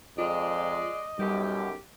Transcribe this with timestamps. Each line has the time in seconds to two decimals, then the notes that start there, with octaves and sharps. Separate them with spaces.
0.18 F2 G#3 F4 D5 D#5
1.19 B1 F#2 G3 G4